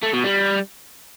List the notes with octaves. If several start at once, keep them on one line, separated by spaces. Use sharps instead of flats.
A3
B2
G3